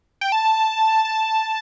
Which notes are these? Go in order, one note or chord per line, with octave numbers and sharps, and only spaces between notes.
G5
A5
A5